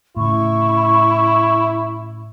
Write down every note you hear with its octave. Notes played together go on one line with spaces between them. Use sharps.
A2 C#3 E4 C#6